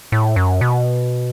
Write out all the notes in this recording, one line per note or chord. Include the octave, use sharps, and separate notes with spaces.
A2
F#2
B2